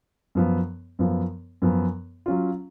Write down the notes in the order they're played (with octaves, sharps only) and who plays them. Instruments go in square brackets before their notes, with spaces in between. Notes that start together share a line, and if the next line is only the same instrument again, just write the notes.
[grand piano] F#2 F3 B3
F#2 F3 B3
F#2 F3 B3
F#3 C#4 F4